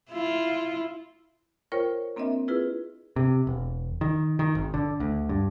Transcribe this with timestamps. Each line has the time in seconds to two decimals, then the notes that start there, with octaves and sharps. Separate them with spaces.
0.11 E4 F4
1.72 F4 A#4 C5 C#5 G5 C#6
2.16 A#3 C4 D4 A#4 D#5 E5
2.48 E4 F4 G#4 B4
3.16 C3
3.47 E1
4.01 D#3
4.39 D#3
4.55 G#1
4.74 D3
5.00 D2
5.29 G2